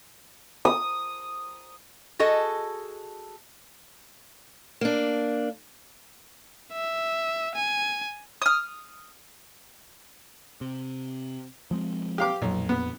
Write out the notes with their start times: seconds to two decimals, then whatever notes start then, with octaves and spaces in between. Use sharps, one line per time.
0.65 D#6
2.19 F#4 G#4 A4 D#5
4.81 A#3 D4
6.73 E5
7.55 G#5
8.42 D#6 F6
10.61 C3
11.71 F3 G#3 C4
12.18 G4 F5 D6
12.42 B1 F2 A#2
12.69 B3